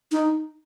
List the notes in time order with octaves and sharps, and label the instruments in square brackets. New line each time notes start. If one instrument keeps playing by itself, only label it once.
[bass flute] D#4